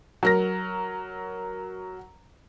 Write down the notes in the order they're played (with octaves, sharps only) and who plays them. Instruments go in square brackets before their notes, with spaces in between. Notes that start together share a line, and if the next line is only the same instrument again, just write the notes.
[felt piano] F#3 A#4 A#6